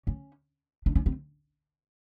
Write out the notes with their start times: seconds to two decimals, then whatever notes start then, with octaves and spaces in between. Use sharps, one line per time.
0.07 C#4
0.86 D4
0.95 C#4
1.06 C4